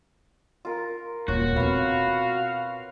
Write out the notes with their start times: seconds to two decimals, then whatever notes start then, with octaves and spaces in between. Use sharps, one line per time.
0.65 F4 A#4
1.28 D#1 F4 F#4 C#5
1.56 B2 C4 B4 F5